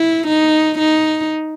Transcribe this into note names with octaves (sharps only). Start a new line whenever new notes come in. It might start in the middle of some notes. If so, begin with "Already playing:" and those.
Already playing: E4
D#4
D#4